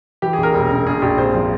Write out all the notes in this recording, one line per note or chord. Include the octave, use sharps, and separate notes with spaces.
E3 G4
G#4
A#1
A#4
E1
C#3
A#1 G#4
A#1 G4
G#1 C5
F3